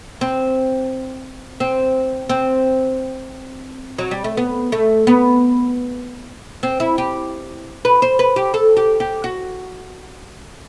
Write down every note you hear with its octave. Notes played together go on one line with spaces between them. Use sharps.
C4
C4
C4
F#3
G3
A3
B3
A3
B3
C4
E4
G4
B4
C5
B4
G4
A4
G4
G4
F#4